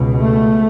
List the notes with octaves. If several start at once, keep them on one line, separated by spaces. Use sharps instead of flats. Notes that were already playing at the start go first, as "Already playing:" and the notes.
Already playing: C#2 B2
A3